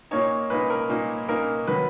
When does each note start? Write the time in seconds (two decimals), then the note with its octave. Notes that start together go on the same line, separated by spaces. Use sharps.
0.11 A#2 A#3 D#4 C#5
0.50 A#2 A#3 D#4 B4
0.70 A#4
0.89 A#2 A#3 D#4
1.28 A#2 A#3 D#4 A#4
1.67 D#3 F#3 B4